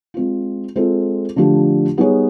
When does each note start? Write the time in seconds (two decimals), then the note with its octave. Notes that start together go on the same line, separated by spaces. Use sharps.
0.14 G#3 C4 F4
0.76 G#3 C4 F4 A4 C5
1.36 D3 F3 A3 D4 G4
1.97 G3 B3 D#4 G#4 C#5